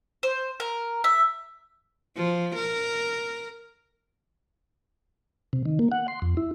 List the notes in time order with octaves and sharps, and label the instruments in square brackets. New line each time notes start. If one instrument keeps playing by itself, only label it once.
[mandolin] C5
A#4
E5
[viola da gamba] F3
A#4
[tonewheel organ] C3
D#3
A#3
F#5
C6
F2
E4